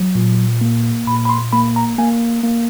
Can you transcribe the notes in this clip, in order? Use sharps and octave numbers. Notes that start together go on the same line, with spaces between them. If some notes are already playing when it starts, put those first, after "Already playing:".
Already playing: F#3
A#2
A#3
A#2 B5
B5
C6
A#3 B5
A#5
A#3 G#5
A#3